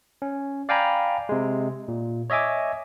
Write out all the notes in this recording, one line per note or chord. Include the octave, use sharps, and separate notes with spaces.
C#4
D5 F5 G5 G#5 A#5 B5
C3 G#3
A#2
C#5 D#5 E5 G#5 D6